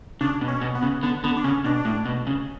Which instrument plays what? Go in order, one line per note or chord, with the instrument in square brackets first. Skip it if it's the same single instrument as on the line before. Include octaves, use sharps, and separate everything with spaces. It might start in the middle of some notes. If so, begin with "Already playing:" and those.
[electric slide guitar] C#3 [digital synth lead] D4
[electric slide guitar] B2
[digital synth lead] C#4
[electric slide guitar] B2
[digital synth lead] B3
[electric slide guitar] C#3
[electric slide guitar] D3 [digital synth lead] B3
[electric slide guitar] D3 [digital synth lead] B3
[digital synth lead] D4
[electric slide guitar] C#3 [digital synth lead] C#4
[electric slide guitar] B2 [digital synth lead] D4
[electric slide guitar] A2
B2
C#3